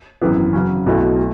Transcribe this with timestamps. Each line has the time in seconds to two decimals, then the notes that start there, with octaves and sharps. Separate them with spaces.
0.22 G#1 F#2 E3 B3
0.53 C#3 F#3 C#4
0.86 B1 B2 F#3 A3 E4
1.18 A3